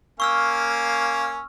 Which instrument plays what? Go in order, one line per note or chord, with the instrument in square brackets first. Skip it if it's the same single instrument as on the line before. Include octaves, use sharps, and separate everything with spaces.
[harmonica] A#3 C#4 F5 [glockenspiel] C#6 E6 F6